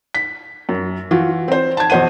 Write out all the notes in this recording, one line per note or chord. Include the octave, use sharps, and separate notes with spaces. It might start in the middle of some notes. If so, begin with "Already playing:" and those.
B6
F#2
E3 F4 F#4
C4 C5
A5 G#6
E2 B2 C5 F#5 D#7